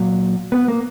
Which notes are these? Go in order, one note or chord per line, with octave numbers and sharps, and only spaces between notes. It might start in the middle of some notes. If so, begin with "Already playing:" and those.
Already playing: A#2 F#3
B3
A#3